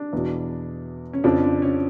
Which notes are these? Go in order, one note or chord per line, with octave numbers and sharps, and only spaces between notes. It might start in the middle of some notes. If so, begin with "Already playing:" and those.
Already playing: D4
E2 B2
C#4
F2 C#3 F3 D4
D4
C#4